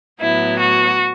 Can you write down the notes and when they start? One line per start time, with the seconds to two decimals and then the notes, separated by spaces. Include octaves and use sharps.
0.21 A2 F#3 B3 E4
0.60 F#4